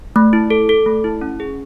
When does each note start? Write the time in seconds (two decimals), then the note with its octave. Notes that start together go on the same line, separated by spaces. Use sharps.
0.16 A3
0.33 E4
0.50 A4
0.69 A4
0.86 A3
1.04 E4
1.21 C#4
1.40 G#4